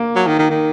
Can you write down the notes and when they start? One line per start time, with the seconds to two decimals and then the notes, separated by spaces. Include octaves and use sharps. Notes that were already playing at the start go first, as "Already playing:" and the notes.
Already playing: A#3
0.16 F#3
0.27 D#3
0.39 D#3
0.50 D#3